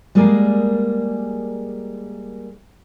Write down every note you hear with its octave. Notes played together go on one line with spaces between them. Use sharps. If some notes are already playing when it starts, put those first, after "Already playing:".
G3 G#3 A#3 G#4 A#4 D5